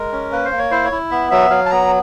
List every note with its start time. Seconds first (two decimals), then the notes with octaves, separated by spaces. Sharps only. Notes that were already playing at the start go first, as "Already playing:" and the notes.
Already playing: G#3 A#4
0.12 C#4
0.32 A#3 B4
0.45 C5
0.52 A#3
0.58 C#5
0.71 E4 C5
0.84 C#5
0.92 E4
1.11 B3 E5
1.31 F#3 E5
1.50 F#3 F5
1.66 A5
1.70 B3 A#5